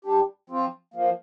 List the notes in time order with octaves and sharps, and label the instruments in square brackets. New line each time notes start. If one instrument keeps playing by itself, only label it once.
[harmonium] G2 G3 D4 G4
F3 C4 F4
F3 A#3